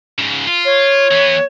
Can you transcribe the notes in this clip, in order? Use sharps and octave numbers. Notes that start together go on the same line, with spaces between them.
G#2 C#3
F4
C#5
E3 B3